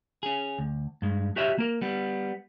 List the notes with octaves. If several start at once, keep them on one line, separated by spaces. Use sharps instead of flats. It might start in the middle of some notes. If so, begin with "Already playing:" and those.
C#4 G#4
D2
G2 G#3
F#4 G4 C#5 D#5 E5
A#3 A#4
G3 B3